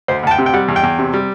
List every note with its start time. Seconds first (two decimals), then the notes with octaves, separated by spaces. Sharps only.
0.08 D2 C5
0.23 D2 A5
0.31 G5
0.38 C3
0.46 G5
0.53 G3 F#5
0.68 E2
0.76 G5
0.83 E2
0.99 C3
1.14 G3